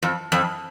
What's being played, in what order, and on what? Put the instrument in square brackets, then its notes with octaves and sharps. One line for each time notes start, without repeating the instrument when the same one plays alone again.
[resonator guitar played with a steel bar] F2
F2